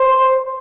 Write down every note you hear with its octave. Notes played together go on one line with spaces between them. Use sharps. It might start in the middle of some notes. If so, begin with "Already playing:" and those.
Already playing: C5